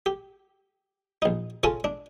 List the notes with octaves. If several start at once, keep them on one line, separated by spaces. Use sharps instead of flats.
G4
A#1 D#4
C#3 F4 A4 C#5 G#5 A5
D4